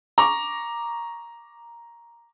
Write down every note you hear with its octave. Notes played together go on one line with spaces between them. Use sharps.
A#5 C#6 D6